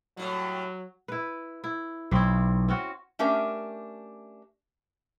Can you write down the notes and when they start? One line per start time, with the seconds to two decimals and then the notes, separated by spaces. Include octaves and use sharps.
0.17 A2 F#3 G3
1.08 E4 B4
1.64 E4
2.11 B1 C4 E4
2.68 C4 C#4 F#4
3.19 A3 C#4 D4 G4 A#4 E5